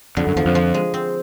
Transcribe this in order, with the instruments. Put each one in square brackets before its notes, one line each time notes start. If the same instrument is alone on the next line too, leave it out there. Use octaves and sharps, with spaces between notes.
[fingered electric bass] F2 [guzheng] D3
[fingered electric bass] F#2
[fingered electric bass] E2 [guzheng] F3
[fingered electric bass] F2
[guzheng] F3
G#3
C4